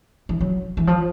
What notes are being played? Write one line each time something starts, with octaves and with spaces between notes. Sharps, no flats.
E3
F#3
E3
F3